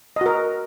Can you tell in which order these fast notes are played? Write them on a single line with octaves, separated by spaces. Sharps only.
D#5 F#4 A#4